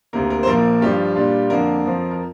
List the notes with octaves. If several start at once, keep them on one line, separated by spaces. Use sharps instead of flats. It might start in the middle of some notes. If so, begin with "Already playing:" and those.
D2 C3 A#3 A#4
A#4
C5
A#1 A#2 F3 A#3 A#4
G2 F3 D4 F4 G4
A#2 G3 D4 F4
F2 D3 A#3 D4 A#4
F2 F3 C4 F4
A#4